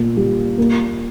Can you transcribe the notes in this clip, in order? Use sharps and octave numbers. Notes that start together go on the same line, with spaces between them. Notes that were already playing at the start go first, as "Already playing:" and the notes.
Already playing: A#2
G3
A#3